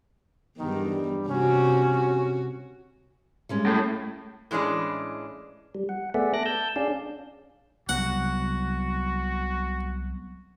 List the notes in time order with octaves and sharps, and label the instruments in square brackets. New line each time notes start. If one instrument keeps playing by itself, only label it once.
[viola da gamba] E2 G2 [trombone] D#3
[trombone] G3
[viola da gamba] C3 F#4 [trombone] C#4
[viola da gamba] F#4
[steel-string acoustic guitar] G3 G#3 C#4
[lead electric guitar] A2
[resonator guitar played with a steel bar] A2 E3 G#3 C#4 D4
[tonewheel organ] G3
F#5
A3 B3 G#4 D5 E5 F#5
A4 D6 F#6 A#6
A5 E6 G6
C#4 D4 G#4 D5 F5
[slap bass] C2 F#3 B3 [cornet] F#4 [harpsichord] F#5